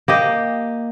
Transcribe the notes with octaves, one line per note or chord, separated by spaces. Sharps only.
A#3 G4 D#5